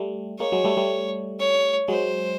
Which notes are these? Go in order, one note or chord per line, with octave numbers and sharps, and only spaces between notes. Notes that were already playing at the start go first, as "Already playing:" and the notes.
Already playing: G3 A3
G#3 A#3 C#5
F#3 G#3
G3 A3
G3 A3
C#5
F#3 G#3 C5